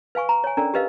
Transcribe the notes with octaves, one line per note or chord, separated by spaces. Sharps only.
B4 F5 G#5 C#6
A#5
C#5 G#5
C#4 D4 A4 A#4 D5 A#5
G4 A#4 B4 D#5 F5